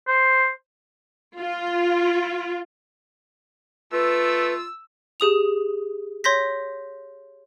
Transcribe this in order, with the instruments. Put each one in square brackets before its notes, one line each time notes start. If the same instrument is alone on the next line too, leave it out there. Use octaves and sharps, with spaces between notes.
[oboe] C5
[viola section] F4
[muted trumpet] A3 [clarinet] F4 [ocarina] B4 [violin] E6
[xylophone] G4 G#4 D#6 F7
C#5 C6 G6 A#6 B6